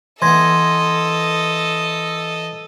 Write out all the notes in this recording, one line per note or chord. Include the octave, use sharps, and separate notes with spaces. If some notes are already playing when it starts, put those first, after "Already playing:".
E3 B3 A4 D#5 C6 G#6 A#6